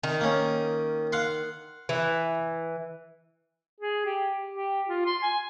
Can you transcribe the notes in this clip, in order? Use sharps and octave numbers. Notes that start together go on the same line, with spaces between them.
D#3
A#3 C#4
F5 F#5 C6
E3
G#4
G4
G4
F4
C6
G#5